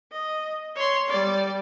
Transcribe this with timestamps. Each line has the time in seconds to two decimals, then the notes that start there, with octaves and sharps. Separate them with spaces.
0.12 D#5
0.76 C#5 C6
1.09 G3 D5